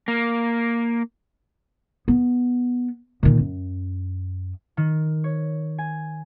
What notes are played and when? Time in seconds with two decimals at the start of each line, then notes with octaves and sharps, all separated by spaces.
0.08 A#3
2.08 B3
3.23 A#2 D#3
3.39 F#2
4.77 D#3
5.24 C#5
5.78 G#5